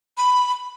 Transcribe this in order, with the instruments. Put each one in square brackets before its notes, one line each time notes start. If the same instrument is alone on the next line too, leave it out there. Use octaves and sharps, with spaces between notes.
[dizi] B5